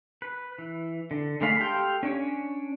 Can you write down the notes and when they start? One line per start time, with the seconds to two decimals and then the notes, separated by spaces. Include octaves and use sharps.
0.22 B4
0.58 E3
1.11 D3
1.41 D3 G#3 A3 F5 B5
1.60 G4 A4 F5 G5 C6
2.03 C#4 D4 C#5